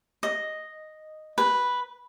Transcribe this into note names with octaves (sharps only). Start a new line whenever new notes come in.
D#5
B4